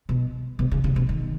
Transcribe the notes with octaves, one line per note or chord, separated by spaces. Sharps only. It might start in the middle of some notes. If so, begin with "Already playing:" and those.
B2
B2
C#3
C#3
B2
D#3